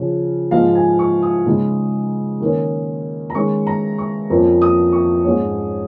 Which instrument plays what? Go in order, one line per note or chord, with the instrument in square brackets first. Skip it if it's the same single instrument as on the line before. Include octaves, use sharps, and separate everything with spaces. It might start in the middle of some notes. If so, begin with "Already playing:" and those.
Already playing: [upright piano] C#3 F3 C#4
G#2 F3 G#3 D#4 F5
G#5
C#6
D#6
C#3 G#3 D#4
D#3 A#3 C#4
A#5
D#3 G#3 C#4 C#6
A#5
C#6
F2 F3 A#3 C#4 A#5
D#6
C#6
G#2 G#3 C#4 C#5